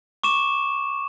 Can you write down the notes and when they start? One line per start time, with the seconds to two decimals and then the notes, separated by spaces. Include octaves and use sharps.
0.23 C#6 D6 E7